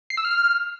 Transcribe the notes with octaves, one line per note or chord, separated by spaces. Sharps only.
C7
E6
F6